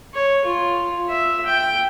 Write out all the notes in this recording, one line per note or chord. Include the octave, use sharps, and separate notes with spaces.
C#5
F4
E5
G5